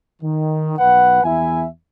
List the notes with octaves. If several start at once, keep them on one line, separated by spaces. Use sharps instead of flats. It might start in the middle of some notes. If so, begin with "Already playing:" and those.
D#3
B1 B4 F#5
E2 E4 E5 G#5